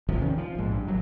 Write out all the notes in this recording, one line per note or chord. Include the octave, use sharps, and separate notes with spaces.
A1 D#2 C3 F3
D#3 C#4
F3
A#1 G#2
G2
G#1 F#3